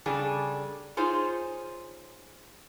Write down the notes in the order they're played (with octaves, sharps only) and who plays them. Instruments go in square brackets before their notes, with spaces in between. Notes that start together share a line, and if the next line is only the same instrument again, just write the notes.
[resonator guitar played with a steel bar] C#3 G3 D4 G#4 A4
D#4 F4 G#4 C5 C#5